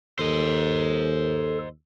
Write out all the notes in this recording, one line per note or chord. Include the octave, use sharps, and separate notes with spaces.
D#2 A4 C5 D#5